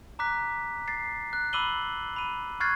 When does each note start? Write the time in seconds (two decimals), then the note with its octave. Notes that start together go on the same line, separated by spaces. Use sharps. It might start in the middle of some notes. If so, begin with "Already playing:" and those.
0.19 A#5 D6 F#6 B6
0.88 A6 C7
1.33 F#6
1.53 B5 D6 E6 D#7 F#7 G7
2.16 B5 D#7
2.60 C#6 F6 F#6 G#6 A6 C7